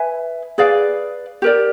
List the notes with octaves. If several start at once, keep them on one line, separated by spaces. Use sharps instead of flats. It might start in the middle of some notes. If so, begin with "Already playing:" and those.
Already playing: B4 E5 G#5
G#4 B4 D5 F5
G4 A#4 D5